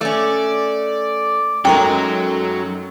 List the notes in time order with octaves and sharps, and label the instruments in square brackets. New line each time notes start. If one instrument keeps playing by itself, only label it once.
[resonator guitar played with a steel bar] A3 C#4 [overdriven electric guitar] D5
[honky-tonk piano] F#2 A3 D#4 [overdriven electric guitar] F#3 [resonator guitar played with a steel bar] G#3 A#4 [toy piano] G5 C#6